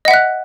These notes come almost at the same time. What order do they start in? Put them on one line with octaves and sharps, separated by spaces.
D#5 F#5 E5 F#6